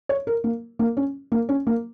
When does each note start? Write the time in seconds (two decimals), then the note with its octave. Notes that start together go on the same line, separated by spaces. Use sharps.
0.09 C#5
0.27 A#4
0.44 A#3
0.79 A#3
0.97 C#4
1.32 A#3
1.49 C#4
1.67 A#3